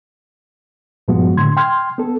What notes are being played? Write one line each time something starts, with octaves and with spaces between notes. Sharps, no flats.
G2 A#2 F3 G#3 B3 F#4
A2 D3 C6 G#6
G5 C6 F6 G#6
B3 A4